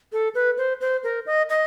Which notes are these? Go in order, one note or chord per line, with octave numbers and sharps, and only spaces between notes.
A4
B4
C5
C5
A#4
D#5
D#5